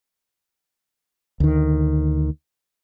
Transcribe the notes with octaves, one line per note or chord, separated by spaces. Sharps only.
D2 D#3